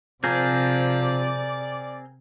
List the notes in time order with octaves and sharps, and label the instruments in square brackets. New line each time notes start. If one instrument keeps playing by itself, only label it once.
[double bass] C3 [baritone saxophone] F3 [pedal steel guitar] C4 G#4 A#4 [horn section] D5